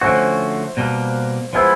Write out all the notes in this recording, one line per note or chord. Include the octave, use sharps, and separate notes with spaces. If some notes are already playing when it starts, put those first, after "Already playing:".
D3 F3 A3 C#4 F#4 C5
B2 G3 A#3
F3 G#3 B3 E4 C5